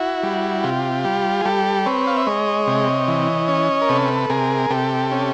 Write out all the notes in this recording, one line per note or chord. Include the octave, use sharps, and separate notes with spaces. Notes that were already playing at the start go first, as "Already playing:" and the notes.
Already playing: E4 F#4
G3
C3 F4 G4
G3
G#4
G3 G4 A4
C4 B4 C#5
F5
E5
G#3 C#5 D#5
C3
E3
C#4
A#4
C3 A4 B4
C3 G#4 A#4
C3 G4 A4
C#4